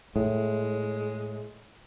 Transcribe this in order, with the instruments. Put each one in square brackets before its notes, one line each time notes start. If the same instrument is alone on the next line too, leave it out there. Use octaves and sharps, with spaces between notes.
[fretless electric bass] A2 [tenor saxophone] G#3